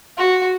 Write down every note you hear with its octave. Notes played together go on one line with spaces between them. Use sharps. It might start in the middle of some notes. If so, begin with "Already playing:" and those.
F#4